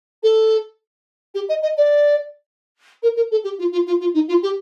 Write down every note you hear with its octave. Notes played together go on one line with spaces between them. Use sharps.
A4
G4
D#5
D#5
D5
A#4
A#4
A4
G4
F4
F4
F4
F4
D#4
F4
G4